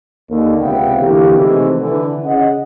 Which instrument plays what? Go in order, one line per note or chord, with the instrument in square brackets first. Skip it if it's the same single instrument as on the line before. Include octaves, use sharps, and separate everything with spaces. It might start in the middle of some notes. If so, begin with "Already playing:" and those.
[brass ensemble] D#2 D3
C#2 C3 B3 E5 F5 G5
D3 E3 A#3 F#4 G4
C3 D#3 E3 G#3 A3
D3 E3
C#3 D#5 F#5